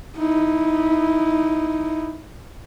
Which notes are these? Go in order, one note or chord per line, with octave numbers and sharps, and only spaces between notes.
D#4 E4